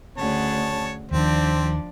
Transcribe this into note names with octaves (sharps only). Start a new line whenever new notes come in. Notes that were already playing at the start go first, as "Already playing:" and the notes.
D2 C#3 C#5 F#5 A5
D#2 D#3 F3 C4 D4 D5